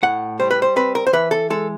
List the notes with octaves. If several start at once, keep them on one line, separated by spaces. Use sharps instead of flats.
A2 F#5
G3 C5
B4
C5
C4 B4
A#4
C5
E3 B4
A4
G#3 A4